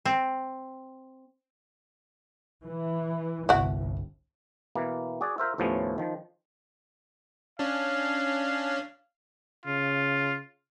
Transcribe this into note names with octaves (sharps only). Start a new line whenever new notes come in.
C4
E3
G1 C2 E4 F#4
B2 E3 A#3
F#4 G#4 D5
F4 A#4 C5 E5
D#2 A2 F3 A3 B3 C#4
D#3 F3
C#4 D4 F5
C#3 F4